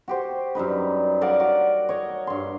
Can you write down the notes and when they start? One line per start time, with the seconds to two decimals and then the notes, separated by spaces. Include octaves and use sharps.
0.08 F#4 G4 C5
0.55 F#2 G3 D#4 B4
1.21 A#4 D5 F5 F#5
1.40 F#4
1.89 C#5 D#5
2.27 G2 C6